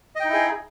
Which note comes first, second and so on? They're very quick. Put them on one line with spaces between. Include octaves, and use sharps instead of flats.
D#5 G5 D#4 E4 G#4